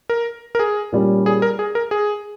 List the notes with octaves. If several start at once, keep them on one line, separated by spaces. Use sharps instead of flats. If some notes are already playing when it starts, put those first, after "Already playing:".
A#4
A#4
G#4
A#2 G3 C#4
G#4
A#4
G#4
A#4
G#4